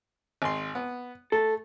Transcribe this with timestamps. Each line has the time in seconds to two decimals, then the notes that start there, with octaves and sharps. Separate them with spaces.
0.42 G#1 C6
0.75 B3
1.32 A3 A4